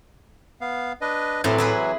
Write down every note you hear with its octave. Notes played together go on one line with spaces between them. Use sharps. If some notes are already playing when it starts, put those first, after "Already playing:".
B3 F5
D4 B4 D#5
A2 E3 F#3 C4 E4
E4 G#4 B4